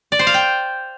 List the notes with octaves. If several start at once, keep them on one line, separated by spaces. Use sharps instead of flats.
D5
C5
F5
G5